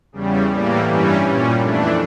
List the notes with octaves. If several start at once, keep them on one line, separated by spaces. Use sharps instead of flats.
E2 C#3 G3
A2 E3 G3 A#3
G2 E3 G3 C#4
A#2 G3 C#4
F2 E3 A3 D4